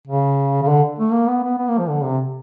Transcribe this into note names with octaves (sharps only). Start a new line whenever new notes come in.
C#3
C#3
D3
A3
A#3
B3
B3
B3
A#3
F3
D3
C3